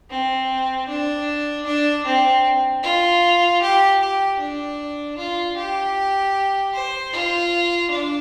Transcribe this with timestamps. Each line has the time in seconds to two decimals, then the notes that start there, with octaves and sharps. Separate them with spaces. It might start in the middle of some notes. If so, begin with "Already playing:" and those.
0.10 C4
0.88 D4
1.66 D4
2.05 C4
2.83 F4
3.61 G4
4.00 G4
4.39 D4
5.17 F4
5.56 G4
6.74 C5
7.13 F4
7.90 D4